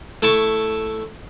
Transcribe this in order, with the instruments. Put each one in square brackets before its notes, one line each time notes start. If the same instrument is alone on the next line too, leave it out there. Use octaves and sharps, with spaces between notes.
[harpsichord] A3 E4 A5 C#6